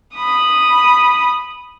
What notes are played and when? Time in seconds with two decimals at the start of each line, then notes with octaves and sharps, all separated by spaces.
0.15 B5 D#6